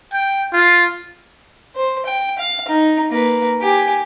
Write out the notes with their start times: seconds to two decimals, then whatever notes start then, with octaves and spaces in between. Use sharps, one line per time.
0.13 G5
0.52 F4
1.76 C5
2.06 G5
2.38 F5
2.68 D#4
3.11 A#3 B4
3.61 G4 G#5